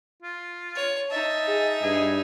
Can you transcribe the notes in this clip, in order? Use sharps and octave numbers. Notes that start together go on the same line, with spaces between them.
F4
C#5
D#4 D#5 E5 A5
G#4 A5
G2 G#4